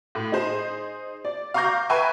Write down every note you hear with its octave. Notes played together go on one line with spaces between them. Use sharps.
A2
D#4 G#4 C5
D5
F5 A#5 C#6 D6 G6 A#6
B4 E5 G5 G#5 A#5 C#6